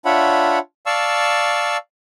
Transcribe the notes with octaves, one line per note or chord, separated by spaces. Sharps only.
D4 F4 C#5 E5 F#5 B5
D5 F5 A5 C#6 E6